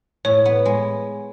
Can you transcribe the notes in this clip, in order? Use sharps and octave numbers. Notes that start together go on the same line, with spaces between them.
A2 C#5
B3
G#3